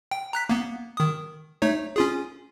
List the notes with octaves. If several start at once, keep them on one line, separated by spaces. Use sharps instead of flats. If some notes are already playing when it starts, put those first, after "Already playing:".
G5
A#5 F#6 B6
A#3 B3
D#3 D#6
A3 D#4 C#5
C#4 F4 G#4